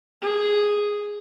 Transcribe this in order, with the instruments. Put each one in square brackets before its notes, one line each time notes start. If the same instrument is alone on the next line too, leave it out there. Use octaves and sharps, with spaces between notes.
[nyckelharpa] G#4